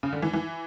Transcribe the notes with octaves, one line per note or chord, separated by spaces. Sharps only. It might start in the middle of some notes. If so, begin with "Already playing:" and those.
C#3
D3
E3
E3